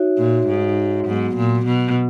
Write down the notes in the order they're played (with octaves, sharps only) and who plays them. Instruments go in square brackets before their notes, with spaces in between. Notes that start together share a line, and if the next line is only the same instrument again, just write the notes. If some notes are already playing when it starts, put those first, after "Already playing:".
Already playing: [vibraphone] D#4 F#4 C#5 E5
[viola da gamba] A#2
G#2
[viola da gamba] G#2 [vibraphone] F#3 B3 F#4
[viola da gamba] A#2
B2